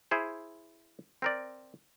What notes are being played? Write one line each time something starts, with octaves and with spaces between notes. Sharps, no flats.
E4 G#4 C5
C4 A#4 D5